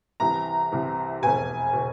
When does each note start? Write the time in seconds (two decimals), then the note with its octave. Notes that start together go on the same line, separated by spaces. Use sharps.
0.20 C2 C3 E3 A#5
0.72 C2 C3 E3
1.22 F1 E2 B2 G#5
1.73 B2